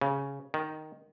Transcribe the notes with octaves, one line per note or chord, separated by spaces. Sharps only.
C#3
D#3